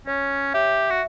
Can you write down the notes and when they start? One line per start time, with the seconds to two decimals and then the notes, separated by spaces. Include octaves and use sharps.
0.07 C#4 C#5
0.54 G4 E5
0.90 F#4